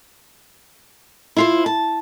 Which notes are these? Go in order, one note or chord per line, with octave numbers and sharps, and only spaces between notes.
E4 F4 C5
A5